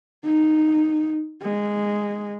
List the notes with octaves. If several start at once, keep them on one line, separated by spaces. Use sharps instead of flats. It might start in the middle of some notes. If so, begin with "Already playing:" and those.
D#4
G#3